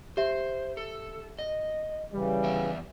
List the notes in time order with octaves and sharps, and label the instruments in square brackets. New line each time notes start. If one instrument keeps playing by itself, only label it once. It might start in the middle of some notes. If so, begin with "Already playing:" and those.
[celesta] G4 E5 [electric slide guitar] C5
[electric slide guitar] A4
D#5
[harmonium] C#3 E3 [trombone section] G3
[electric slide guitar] E2 D5 E5